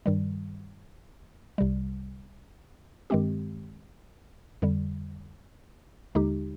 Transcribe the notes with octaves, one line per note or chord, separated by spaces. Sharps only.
G2 D#3 G3
C2 C3 G3
G2 D#3 G#3 C4 G4
F2 D3 G3
D#2 D3 G#3 D#4 G4